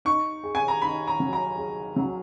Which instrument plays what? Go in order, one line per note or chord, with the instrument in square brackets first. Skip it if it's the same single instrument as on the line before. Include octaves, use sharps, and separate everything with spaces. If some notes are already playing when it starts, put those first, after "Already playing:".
[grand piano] D#4 [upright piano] C#6
[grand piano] G#4
[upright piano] G#5
A#5
[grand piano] D#4 [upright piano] B5
[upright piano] A#5
[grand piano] F#3
[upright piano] A#5
[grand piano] G#4
F#3